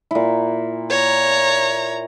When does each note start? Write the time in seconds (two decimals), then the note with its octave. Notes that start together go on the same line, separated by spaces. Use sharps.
0.11 A#2 E4
0.90 C#5 A#5